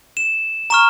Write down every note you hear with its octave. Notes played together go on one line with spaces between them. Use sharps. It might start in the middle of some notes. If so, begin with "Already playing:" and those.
E7
A#5 C#6 F6 E7